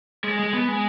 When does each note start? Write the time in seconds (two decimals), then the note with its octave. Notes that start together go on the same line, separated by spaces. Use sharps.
0.24 G#3
0.39 G#3
0.54 B3
0.68 G#3